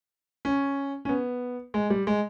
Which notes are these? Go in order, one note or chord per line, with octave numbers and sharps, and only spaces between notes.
C#4
C#4
B3
G#3
G3
G#3